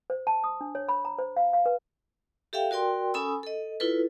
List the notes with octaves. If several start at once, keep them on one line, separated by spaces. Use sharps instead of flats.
C5
A5
D#6
D4
C#5
B5
A#5
C5
F5
F5
B4
G4 A4 E5 F5 G5
F#4 A#4 D5 G5 C6
C#4 A4 G#5 B5 D#6 E6
A4 D#5
E4 F4 A4 B4